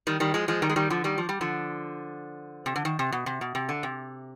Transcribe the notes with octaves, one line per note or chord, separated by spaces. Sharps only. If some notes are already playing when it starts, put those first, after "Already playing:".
D#3 G3
D#3 G3
F3 G#3
F3 G#3
D#3 G3
G#3
D#3 G3
D3 F3
D#3 G3
F3
G3
D3 F3
C3
D3
D#3
C3
B2
C3
B2
C3
D3
C3